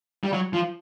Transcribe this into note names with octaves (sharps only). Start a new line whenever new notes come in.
G3
F#3
F3